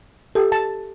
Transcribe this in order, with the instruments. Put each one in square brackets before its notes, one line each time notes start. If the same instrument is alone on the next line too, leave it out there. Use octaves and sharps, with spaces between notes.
[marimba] G4 G5 [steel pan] A4
[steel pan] A5